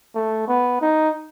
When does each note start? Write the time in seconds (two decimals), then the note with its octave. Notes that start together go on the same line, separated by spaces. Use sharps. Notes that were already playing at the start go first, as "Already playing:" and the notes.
0.15 A3
0.48 B3
0.82 D#4